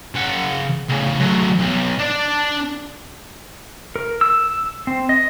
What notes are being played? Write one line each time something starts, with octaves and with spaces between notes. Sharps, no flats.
C#3 F#5
A2 C#3
F#3 A3
B1
D4 D5
A#4
E6
C4
D#5